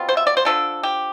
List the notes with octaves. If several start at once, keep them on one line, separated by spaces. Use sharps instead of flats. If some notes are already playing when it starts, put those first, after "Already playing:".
Already playing: B2 G3 C4 F4
C5
E5
D5
C5
D3 F3 A3 D4 A4
G4